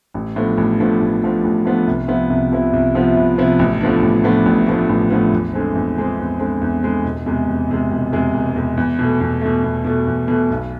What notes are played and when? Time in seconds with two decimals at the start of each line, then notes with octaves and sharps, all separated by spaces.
0.14 A1
0.36 A2 F3 B3 D4
0.58 A1
0.79 A2 F3 B3 D4
1.01 A1
1.22 A2 F3 B3 D4
1.44 A1
1.65 A2 F3 B3 D4
1.87 C2
2.08 C3 F3 B3 E4
2.30 C2
2.51 C3 F3 B3 E4
2.73 C2
2.95 C3 F3 B3 E4
3.17 C2
3.38 C3 F3 B3 E4
3.59 A1
3.81 A2 F3 B3 D4
4.02 A1
4.24 A2 F3 B3 D4
4.46 A1
4.67 A2 F3 B3 D4
4.89 A1
5.10 A2 F3 B3 D4
5.32 E2
5.54 D3 G#3 C4
5.75 E2
5.97 D3 G#3 C4
6.19 E2
6.40 D3 G#3 C4
6.61 E2
6.83 D3 G#3 C4
7.04 E1
7.26 E2 C3 G#3
7.48 E1
7.70 E2 C3 G#3
7.90 E1
8.12 E2 C3 G#3
8.34 E1
8.56 E2 C3 G#3
8.77 E2
8.99 B2 A3
9.21 E2
9.41 B2 A3
9.64 E2
9.85 B2 A3
10.07 E2
10.28 B2 A3
10.50 B1